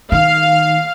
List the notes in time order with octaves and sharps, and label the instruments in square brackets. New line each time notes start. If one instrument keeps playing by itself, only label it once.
[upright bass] D#3 [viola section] F5